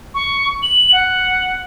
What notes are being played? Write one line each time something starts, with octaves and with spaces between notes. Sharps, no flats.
C#6
F#7
F#5